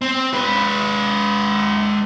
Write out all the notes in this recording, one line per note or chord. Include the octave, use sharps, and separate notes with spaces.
C4
G#3 B4